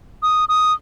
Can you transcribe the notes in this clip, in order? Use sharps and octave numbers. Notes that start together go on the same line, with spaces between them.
D#6
D#6